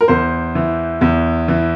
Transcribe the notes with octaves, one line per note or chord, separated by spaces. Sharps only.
A#4
E2 C5
E3
E2
E3